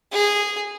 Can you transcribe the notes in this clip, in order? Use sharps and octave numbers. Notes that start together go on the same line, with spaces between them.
G#4